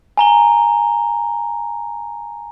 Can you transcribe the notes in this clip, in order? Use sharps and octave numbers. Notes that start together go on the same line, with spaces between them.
G#5 A#5 G7